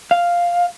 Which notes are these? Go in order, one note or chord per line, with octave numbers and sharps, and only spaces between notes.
F5